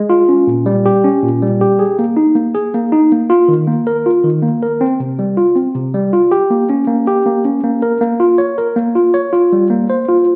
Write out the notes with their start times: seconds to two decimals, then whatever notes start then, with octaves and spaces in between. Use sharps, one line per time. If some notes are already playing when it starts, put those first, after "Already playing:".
Already playing: G#3
0.09 F4
0.29 C#4
0.47 A#2
0.66 G3
0.86 G4
1.04 C#4
1.23 A#2
1.42 G3
1.61 G4
1.79 G#4
1.99 A#3
2.17 D#4
2.35 A#3
2.55 G#4
2.74 A#3
2.92 D#4
3.12 A#3
3.30 F4
3.48 D#3
3.68 A#3
3.87 A#4
4.06 F4
4.24 D#3
4.43 A#3
4.63 A#4
4.81 C4
5.00 C3
5.19 G3
5.37 F4
5.56 C4
5.75 C3
5.94 G3
6.13 F4
6.31 G4
6.50 A#3
6.69 C#4
6.88 A#3
7.07 G4
7.26 A#3
7.45 C#4
7.64 A#3
7.82 A#4
8.01 A#3
8.20 F4
8.38 C#5
8.58 A#4
8.76 A#3
8.95 F4
9.14 C#5
9.33 F4
9.53 G3
9.70 A#3
9.90 C5
10.09 F4